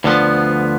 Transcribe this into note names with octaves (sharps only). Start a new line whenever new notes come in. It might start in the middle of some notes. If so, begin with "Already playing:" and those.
D2 D3 F3 B3